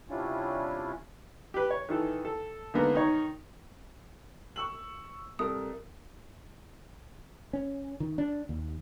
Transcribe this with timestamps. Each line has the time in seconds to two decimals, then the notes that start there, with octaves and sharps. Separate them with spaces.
0.09 C3 G3 C#4 D4 E4 F4
1.54 G4 B4
1.71 C#5
1.89 D#3 E3 A4
2.25 A4
2.74 D3 G#3 A#3 B3 D#4
2.94 D#3 D#4 C#5
4.56 C#6 E6 F#7
5.39 C2 A4 A#4 D#6
7.53 C#4
8.00 D#3
8.18 D4
8.49 D#2